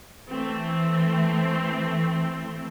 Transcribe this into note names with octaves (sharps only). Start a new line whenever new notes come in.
E3 A3 C4